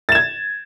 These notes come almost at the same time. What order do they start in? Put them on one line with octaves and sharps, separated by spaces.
A6 E7 G#6